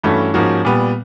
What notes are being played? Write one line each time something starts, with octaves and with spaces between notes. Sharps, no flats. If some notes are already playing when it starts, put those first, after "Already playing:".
G2 E3 A3 C#4 F#4
G#2 F3 A#3 C#4 F#4
A#2 G3 B3